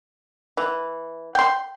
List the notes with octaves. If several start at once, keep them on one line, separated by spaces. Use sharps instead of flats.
E3
G5 C6